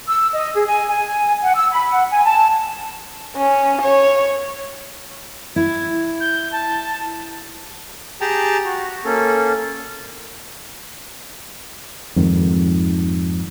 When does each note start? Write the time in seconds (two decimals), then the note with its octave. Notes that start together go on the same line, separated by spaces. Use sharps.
0.08 E6
0.34 D#5
0.55 G#4
0.67 G#5
0.88 G#5
1.43 F#5
1.55 E6
1.72 B5
1.92 F#5
2.10 G#5
2.24 A5
3.36 C#4
3.82 C#5
5.56 E4 G#6
6.20 G6
6.52 A5
8.21 G4 G#4 G5 A5 A#5
8.65 F#4
9.05 A#3 C#4 A4
12.16 F2 G#2 D#3